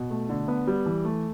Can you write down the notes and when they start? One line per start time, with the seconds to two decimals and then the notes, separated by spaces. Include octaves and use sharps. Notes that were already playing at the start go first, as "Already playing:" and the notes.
Already playing: B2
0.11 A3
0.29 D3
0.48 B3
0.67 G3
0.86 E3
1.05 A3